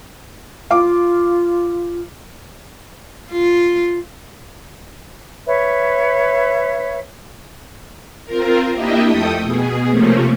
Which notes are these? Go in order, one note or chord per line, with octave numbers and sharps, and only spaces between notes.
F4 F5 D6
F4
B4 C#5 E5
C4 F4 A#4
A#3 D4 E4 G4 D#5 E5
F2 A3 A4 G5 D#6
B2 G#4
C3 F3 A3 A#3 C#4